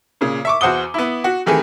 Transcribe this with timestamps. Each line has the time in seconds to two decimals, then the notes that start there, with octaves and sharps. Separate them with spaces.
0.21 A#2 C#3
0.45 E5 C#6 D6
0.61 E2 F#4 C5 F#5 D#6 G7
0.94 B3 E4
1.24 F#4
1.46 C3 D#3 E3 A3 G#4